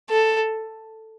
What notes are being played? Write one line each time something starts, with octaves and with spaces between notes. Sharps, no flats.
A4